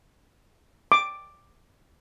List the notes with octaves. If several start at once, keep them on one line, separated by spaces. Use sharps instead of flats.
D6